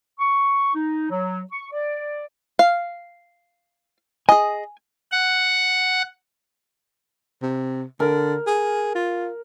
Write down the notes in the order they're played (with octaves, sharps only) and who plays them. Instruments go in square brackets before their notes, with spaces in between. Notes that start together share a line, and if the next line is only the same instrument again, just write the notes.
[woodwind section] C#6
D#4
F#3
C#6
D5
[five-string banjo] F5
[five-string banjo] G#4 D#5 [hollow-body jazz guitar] G#5
[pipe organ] F#5
[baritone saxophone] C3
[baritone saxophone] D3 [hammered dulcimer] A#4
[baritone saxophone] G#4
F4